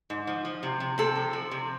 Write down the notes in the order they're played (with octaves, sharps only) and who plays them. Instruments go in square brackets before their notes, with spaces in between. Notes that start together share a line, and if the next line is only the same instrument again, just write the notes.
[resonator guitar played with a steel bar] G#2
F3
F3
C3
C3
[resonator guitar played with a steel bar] C3 [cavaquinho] A4
[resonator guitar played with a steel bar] F3
F3
C3